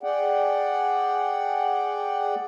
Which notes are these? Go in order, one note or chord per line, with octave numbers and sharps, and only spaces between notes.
G#4 D5 F#5 G5